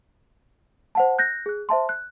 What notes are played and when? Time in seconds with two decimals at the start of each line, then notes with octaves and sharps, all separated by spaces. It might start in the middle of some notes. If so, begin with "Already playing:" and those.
0.95 C5 F#5 A5
1.19 F#6 G6 A#6
1.46 G#4 F#6
1.69 C5 E5 A5 C6
1.89 F#6